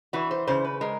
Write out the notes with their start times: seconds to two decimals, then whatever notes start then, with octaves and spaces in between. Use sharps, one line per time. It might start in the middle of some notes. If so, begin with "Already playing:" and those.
0.13 E3 F#4
0.31 C5
0.47 C#3 C5
0.64 B4
0.81 G#3 A#4